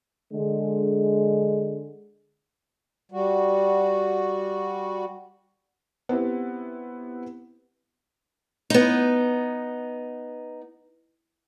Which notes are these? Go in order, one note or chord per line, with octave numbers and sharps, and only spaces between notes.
D3 G#3
G3 F#4
B3 C4 E4 G4
B3 D#4